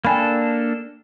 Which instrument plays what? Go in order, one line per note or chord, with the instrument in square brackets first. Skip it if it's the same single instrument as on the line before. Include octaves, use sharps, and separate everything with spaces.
[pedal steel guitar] A#3 D4 A4 [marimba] G5 G#5 B5